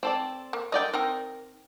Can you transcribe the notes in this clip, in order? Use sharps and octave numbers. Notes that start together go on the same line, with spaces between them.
C4 A4 D5
A#3
D3 A#4 D5 D#5 G5
C4 D#4 A#4 G5